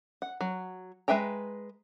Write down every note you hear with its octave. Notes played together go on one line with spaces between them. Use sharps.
F#5
F#3
G#3 B4 E5 G5 A#5